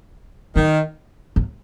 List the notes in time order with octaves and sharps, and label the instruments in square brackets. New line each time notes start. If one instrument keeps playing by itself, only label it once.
[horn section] D#3 [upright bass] F#3
[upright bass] F#3